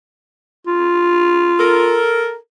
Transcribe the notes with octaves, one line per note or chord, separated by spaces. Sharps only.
F4
A4 A#4